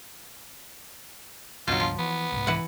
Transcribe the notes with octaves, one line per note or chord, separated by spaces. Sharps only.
C#2 G2 B2 F#3 D4 F4
F3
E3 B3
C2 G#2
E3 F#5